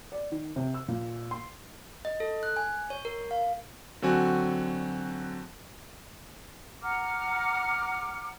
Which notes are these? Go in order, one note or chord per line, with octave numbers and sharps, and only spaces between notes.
D5
D#3
C3
E6
A#2
C6
D#5
A4
F#6
G#5
C#5
A#4
F5
D3 F#3 C4 F#4 G#5
F#5 A#5 D6 F6